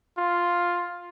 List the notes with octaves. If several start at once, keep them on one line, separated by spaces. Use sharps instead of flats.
F4